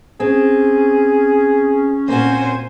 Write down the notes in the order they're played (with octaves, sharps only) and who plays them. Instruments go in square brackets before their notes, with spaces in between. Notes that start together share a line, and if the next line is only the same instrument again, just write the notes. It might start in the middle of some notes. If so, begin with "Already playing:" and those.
[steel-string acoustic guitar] C4 [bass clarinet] C#4 [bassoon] G#4
[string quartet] A#2 C5 G#5 [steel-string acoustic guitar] A#3 C4 F#4